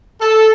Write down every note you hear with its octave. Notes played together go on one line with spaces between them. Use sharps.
A4